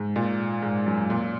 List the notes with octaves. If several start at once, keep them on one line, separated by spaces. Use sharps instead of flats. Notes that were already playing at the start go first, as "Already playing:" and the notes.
Already playing: G#2
A#2
G#2
F#2
A#2